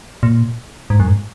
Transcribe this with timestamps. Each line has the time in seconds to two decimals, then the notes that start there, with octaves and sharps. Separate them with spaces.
0.23 A#2
0.90 G#2
1.00 F#2
1.08 G#2